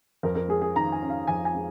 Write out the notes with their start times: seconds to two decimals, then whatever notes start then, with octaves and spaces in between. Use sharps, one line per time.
0.23 F2 A#4
0.35 A#4
0.48 G#3 G#4
0.62 G#4
0.76 D#3 A#5
0.92 G#5
1.02 C#4
1.10 F5
1.27 F2 G#5
1.45 G#5
1.55 G#3